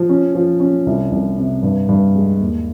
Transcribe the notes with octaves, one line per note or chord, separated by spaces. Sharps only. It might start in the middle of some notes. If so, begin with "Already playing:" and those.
Already playing: F3
C#4
F3
C#4
C2
C2
C3
G2
G2
G#3
D#2